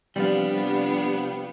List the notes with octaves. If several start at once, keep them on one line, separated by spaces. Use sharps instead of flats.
C3 F3 G3 B3 D4 F5